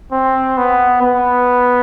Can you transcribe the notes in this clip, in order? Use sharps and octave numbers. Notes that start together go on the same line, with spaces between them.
C4
B3
B3